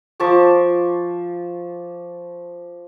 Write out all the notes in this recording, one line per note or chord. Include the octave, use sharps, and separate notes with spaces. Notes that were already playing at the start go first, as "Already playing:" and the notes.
F3 A5 C#6 D6